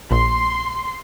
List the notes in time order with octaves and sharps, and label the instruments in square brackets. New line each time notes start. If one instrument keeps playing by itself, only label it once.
[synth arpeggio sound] A#1 [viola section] C6